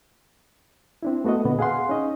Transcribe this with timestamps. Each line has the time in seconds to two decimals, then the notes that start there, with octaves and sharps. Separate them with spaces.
1.03 C4 D4 E4
1.24 A3 B3 F#4 A4 D#5
1.45 A#2 D3 B3
1.59 G#4 F5 F#5 C6
1.89 C#4 D#4 D#5